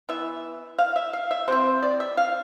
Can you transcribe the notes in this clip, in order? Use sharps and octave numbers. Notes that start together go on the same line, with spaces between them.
E3 B3 E5
F5
E5
F5
E5
C3 G3 C4 C5
D5
E5
F5